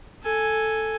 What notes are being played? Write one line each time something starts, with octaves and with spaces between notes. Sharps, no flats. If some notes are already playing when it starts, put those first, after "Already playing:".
A4 G#5